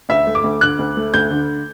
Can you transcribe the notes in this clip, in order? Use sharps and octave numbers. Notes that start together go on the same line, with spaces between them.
D2 E5
A3
D6
D2
D3 F#6
D2
A3
D2 G6
D3